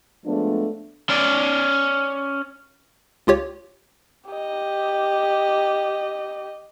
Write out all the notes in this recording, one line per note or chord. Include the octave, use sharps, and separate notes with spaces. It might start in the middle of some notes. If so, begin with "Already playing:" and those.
F3 G#3 A3 B3 D4
C#4 D5
C#2 F4 G4 C#5
G4 D#5